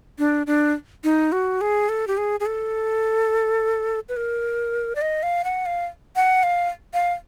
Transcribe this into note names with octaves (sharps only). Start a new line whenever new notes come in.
D4
D4
D#4
F#4
G#4
A4
G4
G#4
G#4
A4
B4
A#4
D5
D#5
F5
F#5
F5
F#5
F5
F5